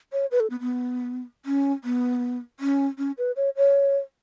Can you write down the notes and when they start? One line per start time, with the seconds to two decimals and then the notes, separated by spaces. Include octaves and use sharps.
0.13 C#5
0.31 B4
0.40 A4
0.50 B3
0.60 B3
1.46 C#4
1.84 B3
2.60 C#4
2.98 C#4
3.18 B4
3.36 C#5
3.57 C#5